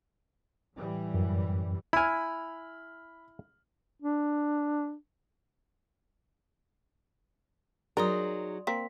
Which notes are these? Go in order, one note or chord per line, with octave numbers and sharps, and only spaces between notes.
A2 E3 G3
F#2
E4 G#5 B5 F6
D4
F#3 D#4 G#4 A#4 D5 C6 D#6
A#3 C4 B6